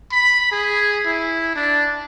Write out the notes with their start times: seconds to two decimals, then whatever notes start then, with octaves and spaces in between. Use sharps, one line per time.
0.12 B5
0.52 G#4
1.06 E4
1.56 D4